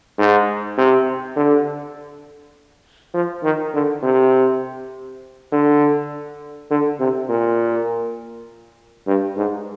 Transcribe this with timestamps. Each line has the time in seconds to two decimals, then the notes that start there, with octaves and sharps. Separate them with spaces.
0.18 G#2
0.78 C3
1.36 D3
3.14 F3
3.43 D#3
3.73 D3
4.03 C3
5.52 D3
6.70 D3
7.00 C3
7.29 A#2
9.07 G2
9.36 G#2